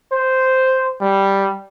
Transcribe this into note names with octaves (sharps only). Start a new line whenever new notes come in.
C5
G3